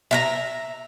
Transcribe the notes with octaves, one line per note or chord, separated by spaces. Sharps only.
E5 F5 A#5